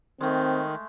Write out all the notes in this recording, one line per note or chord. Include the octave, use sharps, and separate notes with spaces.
D#3 G#3 A3 C4